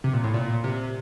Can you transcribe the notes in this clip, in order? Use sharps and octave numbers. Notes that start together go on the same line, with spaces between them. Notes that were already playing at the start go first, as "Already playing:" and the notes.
C3
A#2
A2
A#2
C3